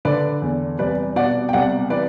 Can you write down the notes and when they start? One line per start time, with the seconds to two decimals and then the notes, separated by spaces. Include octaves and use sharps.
0.05 D3 B4 D5
0.42 E2
0.79 C2 B4 D5
1.16 B2 D5 F#5
1.49 G5
1.53 C2 D5 F#5
1.90 E3 B4 D5